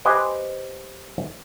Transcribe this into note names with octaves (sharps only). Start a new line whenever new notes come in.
G4 B4 C5 D#5 G5 G#5